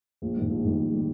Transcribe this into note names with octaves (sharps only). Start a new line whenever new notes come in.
A#1
G#2 D#3 G3
A#1
G#2 D#3 G3
A#1
D#3 G3